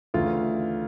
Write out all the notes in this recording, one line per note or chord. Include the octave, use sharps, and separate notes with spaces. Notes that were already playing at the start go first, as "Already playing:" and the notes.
D2 C#3 E3 F4